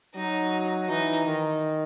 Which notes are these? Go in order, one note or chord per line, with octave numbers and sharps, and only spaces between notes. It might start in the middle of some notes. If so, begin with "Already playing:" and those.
F#3 D#4
E3 D#4
D#3